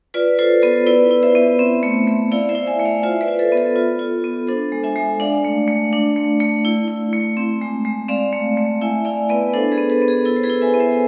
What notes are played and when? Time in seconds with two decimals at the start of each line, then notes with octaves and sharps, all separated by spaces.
0.14 F4 B4 D5
0.39 F4 A4 C5
0.62 B3 A4 C5
0.87 E4 B4 D5
1.11 E4
1.23 C5 E5
1.35 B3
1.59 C4
1.83 A3
2.07 A3
2.31 E4 D5 F5
2.49 C5 E5
2.55 E4
2.67 E5 G#5
2.80 A3
2.85 D5 F5
3.03 F4 C5 E5
3.21 B4 D5
3.28 F4
3.39 A4 C5
3.52 B3
3.57 A4
3.76 F4
3.99 F4
4.24 B3
4.47 D4 A4 C5
4.72 G#3
4.84 E5 G#5
4.96 G#3
5.20 D4 D5 F5
5.44 A3
5.68 A3
5.93 D4
6.16 A3
6.40 A3
6.65 E4
6.88 E4
7.13 A3
7.37 C4
7.61 G#3
7.85 G#3
8.08 C4 D5 F5
8.33 A3
8.57 A3
8.81 E4 E5 G#5
9.05 E4 D5 F5
9.29 B3 B4 D5
9.54 D4 A4 C5
9.72 G#4 B4
9.78 B3
9.90 A4
10.02 B3
10.08 G#4
10.25 E4 A4
10.37 C5
10.43 G#4 B4
10.50 E4
10.62 E5 G#5
10.74 B3
10.80 C5 E5